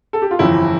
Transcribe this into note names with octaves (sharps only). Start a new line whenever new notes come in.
A4
G4
F4
G1 F2 E3 E4